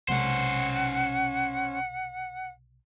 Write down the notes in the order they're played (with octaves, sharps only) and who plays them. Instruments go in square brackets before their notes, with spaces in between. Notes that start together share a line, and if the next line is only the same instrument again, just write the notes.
[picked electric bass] B1 C3 G#3 [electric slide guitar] C#4 C5 [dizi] F#5